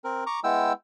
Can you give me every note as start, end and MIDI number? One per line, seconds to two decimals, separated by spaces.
0.04 0.24 60
0.04 0.24 70
0.27 0.40 82
0.27 0.40 85
0.27 0.40 86
0.44 0.73 56
0.44 0.73 59
0.44 0.73 64
0.44 0.73 79
0.44 0.73 88